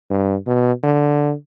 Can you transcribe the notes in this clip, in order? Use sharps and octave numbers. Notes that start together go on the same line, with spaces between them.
G2
B2
D3